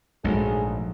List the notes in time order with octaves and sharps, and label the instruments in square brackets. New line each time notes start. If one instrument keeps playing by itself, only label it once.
[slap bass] A#1 [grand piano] G#2 F#3 A3 [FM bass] G#3 [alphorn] G#4